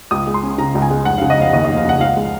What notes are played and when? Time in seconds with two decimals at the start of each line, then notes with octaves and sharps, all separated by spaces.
0.11 C#2 D#6
0.27 G#3
0.34 C6
0.43 C#4
0.58 C#3 A#5
0.75 C#2
0.82 G#5
0.90 G#3
1.05 F1 F#5
1.18 C#3 F5
1.30 D#5
1.38 F1 F5
1.53 D#2 D#5
1.65 F1 D#5
1.77 F5
1.85 C#3 F#5
2.00 C#2 F5
2.17 G#3